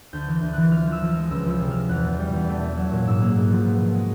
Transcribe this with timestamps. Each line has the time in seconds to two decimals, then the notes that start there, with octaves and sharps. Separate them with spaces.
0.13 D2 G6
0.28 E3
0.33 G6
0.43 D2
0.53 E3 F#6
0.72 F3 F6
0.87 F3 E6
1.02 F3
1.12 G#3 F6
1.30 C#2 E6
1.46 F3 E6
1.60 C3
1.70 C#2 F6
1.89 E2 F#6
2.04 B2
2.19 G3
2.33 E2
2.48 A3
2.63 A3
2.77 F#3
2.92 A#2
3.06 G#2 E6
3.21 A#3
3.35 G#2
3.51 F3
3.65 B2
3.79 B2
3.94 G#3